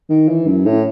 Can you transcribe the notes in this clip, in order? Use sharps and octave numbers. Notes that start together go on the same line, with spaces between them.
D#3
E3
F#2
A2